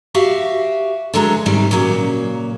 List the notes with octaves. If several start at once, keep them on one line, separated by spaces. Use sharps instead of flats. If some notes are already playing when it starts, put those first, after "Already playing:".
F#4 G4 E5 F5
D3 E3 F#3 G#3 A#5
G#2 C3 D#3 G3
A#2 C#3 F#3 A#3